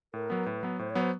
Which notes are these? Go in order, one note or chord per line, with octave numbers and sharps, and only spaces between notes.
A2 A#4
F#3 B3
A2 B4
F#3 B3
A2 C5
C#5
F#3 B3
C5